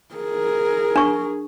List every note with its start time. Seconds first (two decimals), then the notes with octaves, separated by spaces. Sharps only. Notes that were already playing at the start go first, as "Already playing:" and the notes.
0.15 G#4 A#4
0.96 D4 C#6